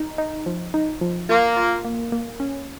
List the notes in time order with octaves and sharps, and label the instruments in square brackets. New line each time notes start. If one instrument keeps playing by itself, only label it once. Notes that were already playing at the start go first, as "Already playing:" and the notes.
Already playing: [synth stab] D#4
D#4
F3
D#4
F3
[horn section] A#3 [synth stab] F4
[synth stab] F4
A#3
A#3
C#4